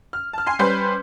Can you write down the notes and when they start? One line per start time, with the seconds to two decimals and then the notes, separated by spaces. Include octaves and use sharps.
0.13 F6
0.33 A5 F6
0.47 G#5 C6 C7
0.59 G3 C#4 B4 C5 C6 G6